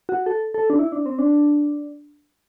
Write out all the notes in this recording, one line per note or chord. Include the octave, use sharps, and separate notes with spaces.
F#4
A4
A4
D4
E4
D4
C4
D4